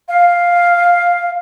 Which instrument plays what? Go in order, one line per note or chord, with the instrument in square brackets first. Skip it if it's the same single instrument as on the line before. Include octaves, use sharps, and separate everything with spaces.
[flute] F5